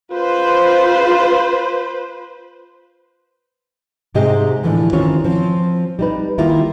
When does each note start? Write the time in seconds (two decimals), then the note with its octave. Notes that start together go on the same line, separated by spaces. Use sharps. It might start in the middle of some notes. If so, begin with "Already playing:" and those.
0.11 F4 B4 C5
4.14 G#2 C3 G#3 G4 D#5
4.63 A2 D3 E3 F3 D4
4.93 D#3 E3 C4 C#4 F4 C#5
5.24 F3 C4
5.99 G3 D#4 B4
6.38 D#3 G3 A#3 E4 F4